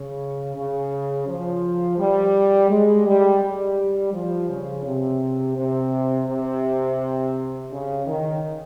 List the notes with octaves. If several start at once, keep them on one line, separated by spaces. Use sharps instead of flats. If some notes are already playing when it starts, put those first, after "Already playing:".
Already playing: C#3
C#3
F3
G3
G#3
G3
G3
F3
C#3
C3
C3
C3
C#3
D#3